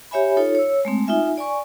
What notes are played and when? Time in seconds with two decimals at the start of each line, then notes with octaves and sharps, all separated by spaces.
0.11 G4 C#5 E5 G#5 B5
0.37 D#4 F4 A4 C#5
0.55 C#5 E6
0.85 G#3 A3 C4
1.07 D#4 F4 E5 G#5
1.38 D5 G#5 C#6